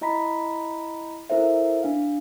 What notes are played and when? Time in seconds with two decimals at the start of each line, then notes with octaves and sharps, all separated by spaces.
0.01 E4 D#5 A#5 B5 B6
1.30 E4 A4 A#4 C5 E5
1.83 D4 F5